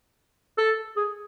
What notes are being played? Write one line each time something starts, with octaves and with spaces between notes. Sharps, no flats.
A4
G#4